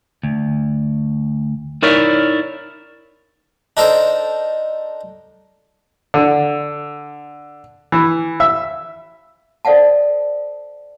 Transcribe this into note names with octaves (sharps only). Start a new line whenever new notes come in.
D2
D#4 E4 A#4 C#5 D5 E5
D4 D#4 A4 A#4 C5
D3
E3
E5
A4 C5 D5 F5 F#5 A5